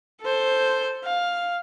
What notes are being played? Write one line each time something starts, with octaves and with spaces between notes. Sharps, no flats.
A4 C5
F5